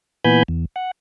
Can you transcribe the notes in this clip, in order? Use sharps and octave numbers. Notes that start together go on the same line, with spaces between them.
A#2 E3 B3 G#5 B5 G6
E2
F#5